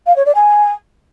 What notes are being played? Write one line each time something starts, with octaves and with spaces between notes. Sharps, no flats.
F5
C#5
D5
G#5